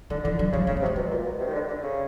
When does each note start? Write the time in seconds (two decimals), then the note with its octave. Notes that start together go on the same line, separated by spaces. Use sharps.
0.10 D3 D#3
0.24 D3 E3
0.38 D3 F#3
0.52 C#3 G#3
0.67 C#3 A3
0.77 G#3
0.82 C3
0.86 A3
0.96 B2 G#3
1.11 A#2
1.25 B2
1.40 C3
1.47 D#3
1.54 D3
1.68 D3
1.83 C#3